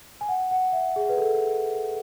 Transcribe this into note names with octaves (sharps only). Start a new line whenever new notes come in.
G#5
F#5
F#5
E5
G#4
B4
A4